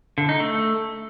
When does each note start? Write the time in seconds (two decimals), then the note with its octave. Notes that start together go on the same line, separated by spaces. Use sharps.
0.18 D3
0.29 D#4
0.40 A3